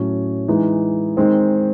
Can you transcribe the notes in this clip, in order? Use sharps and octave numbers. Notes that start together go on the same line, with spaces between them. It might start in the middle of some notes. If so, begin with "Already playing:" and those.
Already playing: A2 F#3 C#4
E3 G#3 D#4
D#3 G#3 C4